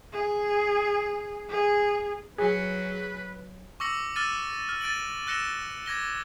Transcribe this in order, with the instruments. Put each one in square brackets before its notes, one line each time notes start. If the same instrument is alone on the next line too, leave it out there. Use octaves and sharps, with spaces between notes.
[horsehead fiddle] G#4
G#4
[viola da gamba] F#3 [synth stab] G#4 [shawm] B4
[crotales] C#6 D6 E6 A#6 C#7 F#7
D6 E6 F6 A6 D#7
F6
A6 D7 D#7 F#7
E6 F#6 A#6 C#7 E7 G7
D6 G#6 A#6 G7